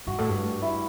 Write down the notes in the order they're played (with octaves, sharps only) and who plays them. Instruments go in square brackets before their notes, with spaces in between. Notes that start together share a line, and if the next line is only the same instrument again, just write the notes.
[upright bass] G2 [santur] F#4
[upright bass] A2
G2
[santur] E4